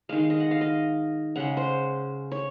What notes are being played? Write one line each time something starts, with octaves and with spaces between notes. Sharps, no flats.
D#3 G#3 F5
F5
D#5
F#5
F5
D#5
C#3 G#3 F#5
C5
C#5